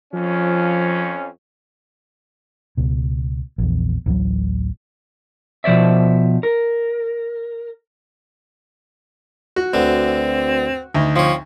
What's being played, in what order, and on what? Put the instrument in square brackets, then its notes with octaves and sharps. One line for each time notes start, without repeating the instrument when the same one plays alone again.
[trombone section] F2 C#4 [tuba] F3
[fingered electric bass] C#2 B2
A#1 E2
A1 D2 E3 F#3
[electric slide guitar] B2 F3 C5 D5 E5
A#4
[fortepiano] F#4
[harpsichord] D2 D3 B3 [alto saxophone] C4
[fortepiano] D2 D#4
[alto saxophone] F3 [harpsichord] C4 C#5